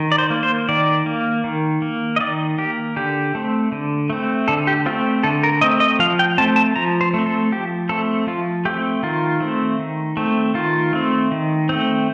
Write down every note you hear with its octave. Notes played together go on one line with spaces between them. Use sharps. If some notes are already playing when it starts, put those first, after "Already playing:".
Already playing: D#3
D5
C5
A#3
C5
D#3 D5
A#3
D#3
A#3
D#5
D#3 D5
A#3 G4
D3 G4
A3 C4
D3
A3 C4
D3 A4
G4
A3 C4 F4
D3 A4
A#4
A3 C4 D#5
D#5
F3 F5
G5
A3 C4 A5
A5
F3 A#5
C5
A3 C4
A4
F3 G4
A3 C4 A4
F3 F4
A3 C4 G4
D#3 F4
A3 C4
D#3
A3 C4
D#3 F4
A3 C4
D#3
A3 C4